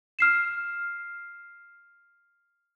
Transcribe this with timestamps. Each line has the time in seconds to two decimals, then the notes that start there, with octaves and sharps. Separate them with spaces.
0.19 F6 C7 E7